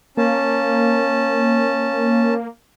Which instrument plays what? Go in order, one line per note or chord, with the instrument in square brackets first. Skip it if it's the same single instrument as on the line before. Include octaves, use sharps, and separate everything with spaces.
[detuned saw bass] A#3 [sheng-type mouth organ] C#4 A5